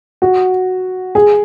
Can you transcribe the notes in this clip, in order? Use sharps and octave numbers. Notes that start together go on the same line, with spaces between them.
F#4
G#4